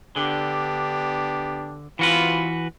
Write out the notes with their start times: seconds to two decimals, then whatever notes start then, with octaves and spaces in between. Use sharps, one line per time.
0.16 D3 B3 D4 G4
1.99 E3 C4 F4 F#4 B4